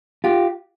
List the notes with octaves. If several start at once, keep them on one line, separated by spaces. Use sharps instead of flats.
F4 G4